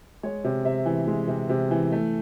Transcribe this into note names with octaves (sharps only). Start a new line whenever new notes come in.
G#3 C#5
C3
C3 E5
E3
G#3
C3
C3
E3
A3